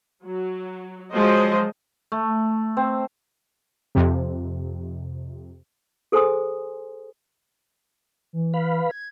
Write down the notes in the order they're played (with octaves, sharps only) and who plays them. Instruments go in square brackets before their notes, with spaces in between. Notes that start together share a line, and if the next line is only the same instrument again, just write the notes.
[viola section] F#3
F3 F#3 G#3 C5 D#5
[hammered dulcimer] A3
C4
[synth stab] F2 C3
[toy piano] G#4 A4 C5 G#5 C6 D#6
[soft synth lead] E3
[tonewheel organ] B4 F5 B5
[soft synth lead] G#6